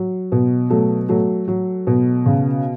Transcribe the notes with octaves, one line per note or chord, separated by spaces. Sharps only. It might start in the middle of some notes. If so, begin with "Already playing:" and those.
Already playing: F#3
B2
F#3 A3
F#3 A3
F#3
B2
C#3